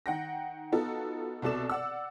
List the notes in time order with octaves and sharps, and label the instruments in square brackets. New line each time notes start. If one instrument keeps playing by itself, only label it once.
[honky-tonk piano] D#3 F#5 G5 A#6
B3 D#4 F4 F#4 A4
C2 B2 A4 D5 E7
D5 F#5 E6